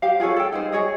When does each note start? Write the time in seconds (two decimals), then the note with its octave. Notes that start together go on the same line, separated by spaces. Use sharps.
0.02 G4 C5 F5
0.20 F4 G#4 A4 C#5
0.36 A4 G5
0.52 D#4 G#4 C5
0.72 G#4 C#5 D#5